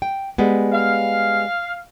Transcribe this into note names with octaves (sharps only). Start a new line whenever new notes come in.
G5
G3 G#3 B3
F5